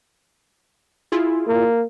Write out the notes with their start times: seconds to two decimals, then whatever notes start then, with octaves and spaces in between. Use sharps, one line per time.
1.12 E4 F4 G#4
1.47 A#3